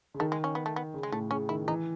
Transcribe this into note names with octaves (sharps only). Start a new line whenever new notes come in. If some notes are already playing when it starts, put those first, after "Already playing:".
C#3
D#3 A3
G#3
C#4
B3
A3
B3
C#3
G#3
A2 A3
C#3 C#4
D#3 E4
E3 D#4